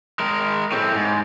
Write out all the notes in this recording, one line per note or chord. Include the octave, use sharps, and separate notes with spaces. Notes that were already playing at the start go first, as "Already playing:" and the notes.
G#3 A#4
A2 C4
G#2